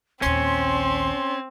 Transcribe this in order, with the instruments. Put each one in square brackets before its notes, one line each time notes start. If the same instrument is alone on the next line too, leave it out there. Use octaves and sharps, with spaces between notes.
[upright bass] A#1 D#2 [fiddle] C4 [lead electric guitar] C#4 [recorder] C6